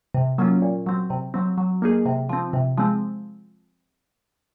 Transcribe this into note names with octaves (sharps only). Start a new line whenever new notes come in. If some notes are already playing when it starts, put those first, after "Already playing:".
C3
F#3 A#3 C#4 F4
A#2
F#3 C4
C3
F#3 C4
F#3
A#3 D#4 G#4
C3
F3 C4
C3
F3 G#3 C4